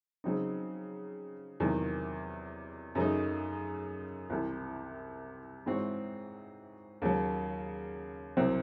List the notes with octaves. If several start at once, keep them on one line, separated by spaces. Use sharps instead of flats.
C#3 F#3 C4 D#4
E2 C3 D#3 F#3
F#2 C#3 F#3 A3 D#4
C2 C3 E3
G#2 E3 C4 F#4 C#5
D#2 C#3 F#3
C2 C3 F#3 C4